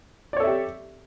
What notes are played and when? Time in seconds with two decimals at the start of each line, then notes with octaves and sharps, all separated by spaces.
0.33 D5
0.37 C#5
0.40 A4
0.43 E5
0.47 G4